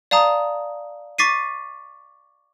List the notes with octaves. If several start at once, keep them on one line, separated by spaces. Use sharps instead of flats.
D5 F5 A5 A#5 D#6
C#6 D6 A6 B6 C7 D#7